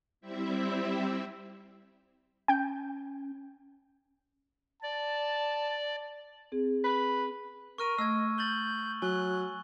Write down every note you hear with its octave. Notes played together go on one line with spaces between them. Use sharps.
G3 C4 E4 E5
C#4 G5 G6
D5 A5
C4 G#4
B4
A#4 C#6 F6 D#7
A3 D#5 E6 F6 G#6
G6 A6 F#7 G7
F#3 G#5 F#6 G7